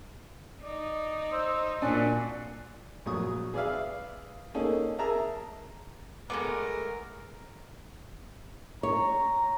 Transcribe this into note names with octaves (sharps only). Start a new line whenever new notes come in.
D#4 D5
C5 E6
A#2 D4 F#4 G#5
A#1 F#3 C#6 D#6
G#4 B4 D5 E5 F5
A#3 C#4 D#4 G#4 A4
G#4 A#4 E5 A5 A#5
G#3 A3 B3 A#4 D6
C#5 A#5